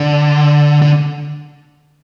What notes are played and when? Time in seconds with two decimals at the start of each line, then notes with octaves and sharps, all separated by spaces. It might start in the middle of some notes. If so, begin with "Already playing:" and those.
Already playing: D3
0.82 D3